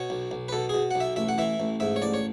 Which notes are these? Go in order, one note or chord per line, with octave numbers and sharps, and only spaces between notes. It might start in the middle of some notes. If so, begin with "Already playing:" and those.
Already playing: B2 C#5
B1
B1
B4
B2 A4
B2 G#4
B1 F#5
E5
A1 E5
F#5
E3 E5
A1
G#2 E5
C#5
A1 D5
C#5